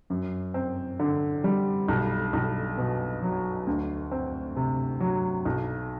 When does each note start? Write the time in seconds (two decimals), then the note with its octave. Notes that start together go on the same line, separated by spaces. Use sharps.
0.10 F#2
0.54 C4
0.99 D3
1.44 G3
1.88 B1
2.33 B1
2.78 B2
3.23 F#3
3.67 D2
4.12 C4
4.56 C3
5.00 F#3
5.46 B1